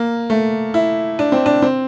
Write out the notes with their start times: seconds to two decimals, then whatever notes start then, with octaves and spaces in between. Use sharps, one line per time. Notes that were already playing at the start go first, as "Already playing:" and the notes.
Already playing: A#3
0.30 A3
0.74 E4
1.19 D4
1.32 C4
1.46 D4
1.62 C4